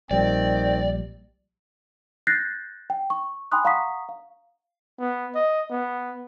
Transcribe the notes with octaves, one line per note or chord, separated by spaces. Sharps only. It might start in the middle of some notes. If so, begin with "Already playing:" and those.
A#1 D#3 G3 C4 D5 G5
F#6 G6 A6 A#6 C7
G5
C#6
G5 G#5 B5 C6 D#6 F#6
F5 F#5 A#5 C#6 D#6 B6
F5
B3
D#5
B3